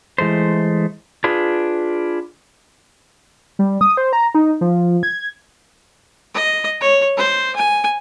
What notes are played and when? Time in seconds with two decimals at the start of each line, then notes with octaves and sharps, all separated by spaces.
0.18 E3 G#3 A3 C5
1.24 D4 F4 G#4 B4
3.59 G3
3.81 D#6
3.97 C5
4.13 A#5
4.35 D#4
4.61 F3
5.03 G#6
6.34 D#5
6.81 C#5
7.17 C5
7.55 G#5